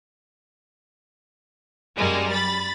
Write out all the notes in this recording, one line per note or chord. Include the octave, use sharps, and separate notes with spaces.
F#2 G3 G#3 A#3
B5 A6